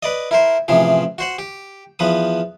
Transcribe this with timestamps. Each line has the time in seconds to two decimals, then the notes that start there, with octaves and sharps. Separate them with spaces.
0.03 B4 D5 D#5
0.31 E4 A#4 C5
0.68 A1 C3 E3 F3 G#4
1.18 F#4 C5 F#5
1.39 G4
1.99 E2 F3 B4 D#6